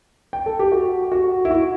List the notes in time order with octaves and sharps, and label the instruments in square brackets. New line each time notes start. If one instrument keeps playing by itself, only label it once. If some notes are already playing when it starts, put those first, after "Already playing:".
[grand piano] G5
A4
G4
F#4
F#4
E4
F#4